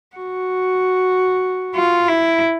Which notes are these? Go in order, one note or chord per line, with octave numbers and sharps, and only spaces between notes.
F#4
F4
E4